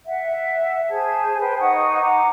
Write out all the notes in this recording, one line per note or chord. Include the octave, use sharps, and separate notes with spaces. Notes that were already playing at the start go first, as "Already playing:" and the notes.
E5 F#5
G#4 C5 A5 G#6
B4 C5 G5
D#4 F#5 C#6 D#6
F#5 A#5 D6